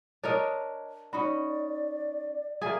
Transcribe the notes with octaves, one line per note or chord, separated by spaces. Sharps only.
D4 A#4 C#5 D#5
C#4 D#4 F#4 D5 B5
A#3 G#4 D5 E5 G#5